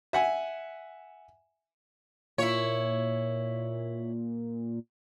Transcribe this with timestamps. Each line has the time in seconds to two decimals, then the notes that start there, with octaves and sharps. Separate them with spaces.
0.13 E5 F#5 G#5
2.38 A#2 E4 C#5